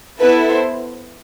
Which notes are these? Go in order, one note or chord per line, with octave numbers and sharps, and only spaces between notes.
B3 E4 A4 B4
C5